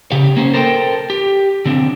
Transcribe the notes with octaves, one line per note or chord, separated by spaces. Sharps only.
C#3 G4 F5
A#3 C#4 C5
A4 A#4 C5 C#5 G5
G4
D3 C4 D4